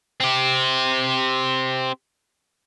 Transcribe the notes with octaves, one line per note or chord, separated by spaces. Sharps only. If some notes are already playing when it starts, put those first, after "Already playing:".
C4 G4